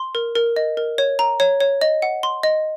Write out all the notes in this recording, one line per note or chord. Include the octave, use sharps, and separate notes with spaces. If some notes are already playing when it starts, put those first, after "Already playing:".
Already playing: C6
A#4
A#4
D#5
A#4
C#5
A#5
C#5
C#5
D#5
F#5
C6
D#5